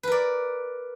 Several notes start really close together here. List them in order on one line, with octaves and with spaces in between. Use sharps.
B4 A#4 D5